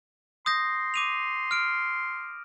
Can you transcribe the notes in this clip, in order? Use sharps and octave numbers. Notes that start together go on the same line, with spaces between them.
C6 D#6 G6 A#6
D6 D#7 F7
F6 D7